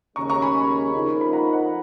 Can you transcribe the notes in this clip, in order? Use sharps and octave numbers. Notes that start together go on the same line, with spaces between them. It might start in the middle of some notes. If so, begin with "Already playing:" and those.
D#2 C#3 G#3 C#4 A#5 C#6
A#5 C#6
G#5 B5
F2 F3 A#3 D#4
B5
F#5 A#5
D#5 F#5